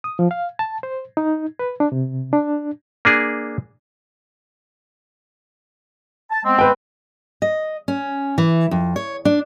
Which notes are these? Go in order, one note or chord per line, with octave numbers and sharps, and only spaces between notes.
D#6
F3
F5
A5
C5
D#4
B4
D4
C3
D4
A#3 D4 G#4
A5
G#3 B3 C4
B4 G5
D#5
C#4
E3
F2
C#5
D4